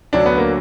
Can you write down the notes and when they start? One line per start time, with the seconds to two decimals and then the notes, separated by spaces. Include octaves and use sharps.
0.13 D2 D3 F#3 D4
0.26 B3
0.38 A#3